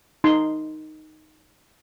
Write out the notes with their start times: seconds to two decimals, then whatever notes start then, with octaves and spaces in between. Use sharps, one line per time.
0.24 D#4 C6